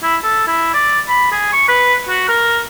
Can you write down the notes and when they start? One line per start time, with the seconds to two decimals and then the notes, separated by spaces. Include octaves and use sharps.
0.02 E4
0.23 A4
0.47 E4
0.74 D5
1.08 B5
1.32 G#4
1.53 C#6
1.68 B4
2.08 F#4
2.28 A#4